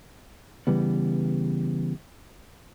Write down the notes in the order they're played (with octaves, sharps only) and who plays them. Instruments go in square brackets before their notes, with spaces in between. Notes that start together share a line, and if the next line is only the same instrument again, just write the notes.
[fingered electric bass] C#3 E3 G3 B3